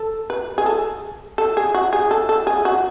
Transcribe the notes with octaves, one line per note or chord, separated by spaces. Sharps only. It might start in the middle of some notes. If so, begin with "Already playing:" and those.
Already playing: A4
B4
G#4
A4
A4
G#4
F#4
G#4
A4
A4
G#4
F#4